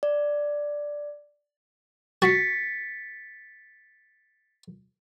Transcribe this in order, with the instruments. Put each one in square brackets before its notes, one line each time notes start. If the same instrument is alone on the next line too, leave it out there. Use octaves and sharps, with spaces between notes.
[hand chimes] D5
[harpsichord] F#4 [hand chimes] A6 B6 C#7